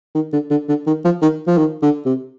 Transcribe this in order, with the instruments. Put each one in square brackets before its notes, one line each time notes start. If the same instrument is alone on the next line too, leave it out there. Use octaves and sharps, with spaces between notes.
[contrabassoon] D#3
D3
D3
D3
D#3
F3
D#3
F3
D#3
D3
C3